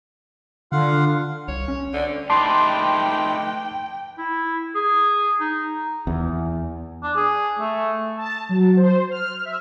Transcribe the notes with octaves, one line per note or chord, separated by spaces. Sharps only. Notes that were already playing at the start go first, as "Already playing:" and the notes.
D3 F4 F5 F#5
C2 C#5
C#4
D3
A3 D#4 B4 G5 A5 C6 D6
E4
G#4
D#4
E2
D4
G#4
A3
A5
F#3
C5
F6
E5